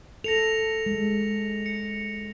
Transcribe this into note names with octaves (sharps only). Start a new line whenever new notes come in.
A4 A#6 C#7 F7
G#3
C#7